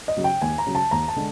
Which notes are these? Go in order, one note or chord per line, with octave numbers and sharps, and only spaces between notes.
D#5
C#3 F#3
G5
D#2 G#5
A#5
C#3 F#3
A5
D#2 A#5
A5
D3 G#3